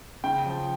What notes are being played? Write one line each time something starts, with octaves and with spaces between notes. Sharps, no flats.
C#3 G5
F3